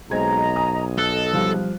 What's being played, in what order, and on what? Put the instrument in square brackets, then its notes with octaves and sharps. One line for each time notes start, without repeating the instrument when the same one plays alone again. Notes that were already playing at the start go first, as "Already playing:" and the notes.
[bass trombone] B1 [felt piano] G#3 C4 G#6 [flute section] D#5 A#5
[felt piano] G#5 D#6
[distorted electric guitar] A4 [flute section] D#5 [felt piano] F#6
[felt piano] F3 G3 F5